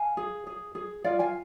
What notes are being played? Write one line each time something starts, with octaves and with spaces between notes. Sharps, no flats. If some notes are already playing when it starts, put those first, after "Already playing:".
Already playing: F5 G#5
G#4
G#4
G#4
F4 D5 F5
F5 G#5